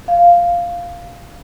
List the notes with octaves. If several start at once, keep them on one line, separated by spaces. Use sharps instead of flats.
F5